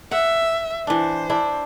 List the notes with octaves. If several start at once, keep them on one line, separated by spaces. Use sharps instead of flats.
E5 F#5
E3 D4 C5
D4 E4